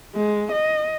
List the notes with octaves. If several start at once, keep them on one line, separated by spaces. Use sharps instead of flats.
G#3
D#5